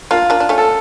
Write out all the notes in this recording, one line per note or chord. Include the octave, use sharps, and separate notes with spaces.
A#3 D4 F4
A#3 D4
D4
A3 C#4
A4